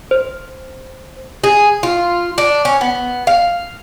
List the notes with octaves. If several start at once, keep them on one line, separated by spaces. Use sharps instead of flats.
C5
G#4
F4
D4
C#4
B3
F5